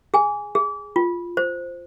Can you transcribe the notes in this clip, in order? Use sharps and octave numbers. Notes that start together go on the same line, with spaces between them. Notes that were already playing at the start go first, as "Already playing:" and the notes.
G#4 G#5
G#4
F4
C5